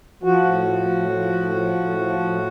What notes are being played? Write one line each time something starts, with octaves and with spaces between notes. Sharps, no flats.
F3 F#4
A2
F3
A2
F3
A2
F3
A2
F3
A2